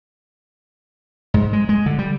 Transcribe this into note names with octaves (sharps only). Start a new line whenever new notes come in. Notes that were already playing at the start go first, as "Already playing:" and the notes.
G#2
G#3
G#3
D3
G3